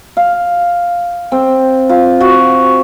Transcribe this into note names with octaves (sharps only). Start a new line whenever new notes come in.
F5
C4
F4
F#4